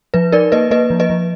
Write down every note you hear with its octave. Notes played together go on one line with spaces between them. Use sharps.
F3 B4
D#4 A#4 D5
A#3 B4 D#5
A#3 B4 D#5
F3
B4 D#5
F3